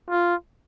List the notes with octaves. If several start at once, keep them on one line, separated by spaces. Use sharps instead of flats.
F4